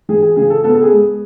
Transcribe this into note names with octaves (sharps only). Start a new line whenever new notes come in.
E3 G#4
G#4
C#3 G#4
A4
B3 A4
A4
G#4
G#3